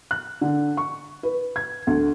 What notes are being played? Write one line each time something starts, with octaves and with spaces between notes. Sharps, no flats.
F#6
D3
C#6
B4
G#6
D2